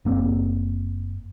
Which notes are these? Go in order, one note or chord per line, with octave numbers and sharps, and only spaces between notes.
F#1 A#3 C4